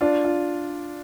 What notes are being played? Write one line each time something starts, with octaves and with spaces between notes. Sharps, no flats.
D4 F4
F4